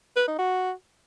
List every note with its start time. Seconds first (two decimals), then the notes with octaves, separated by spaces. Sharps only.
0.16 B4
0.27 D#4
0.39 F#4